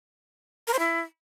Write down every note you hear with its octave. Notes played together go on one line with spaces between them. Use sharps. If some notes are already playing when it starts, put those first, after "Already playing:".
A#4
C5
E4